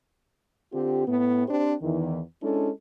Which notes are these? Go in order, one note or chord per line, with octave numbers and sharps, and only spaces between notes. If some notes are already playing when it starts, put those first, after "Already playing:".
D3 C4 F4 G4
A2 B3
C4 D4 G4 C5
E2 D#3 E3
G#3 C#4 D4 E4 A4